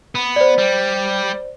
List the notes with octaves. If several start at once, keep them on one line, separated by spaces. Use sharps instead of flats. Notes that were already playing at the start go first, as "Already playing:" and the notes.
B3
C5 D5
G3